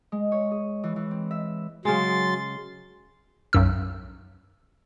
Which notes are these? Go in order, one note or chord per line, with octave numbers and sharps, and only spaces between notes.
G#3
C#5
G#4
E3
E3
C4
E5
C#3 F#3 G#3 C6 A6
B1 F#2 E6